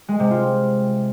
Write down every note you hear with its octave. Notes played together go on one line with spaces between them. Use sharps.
G#3
C3
F4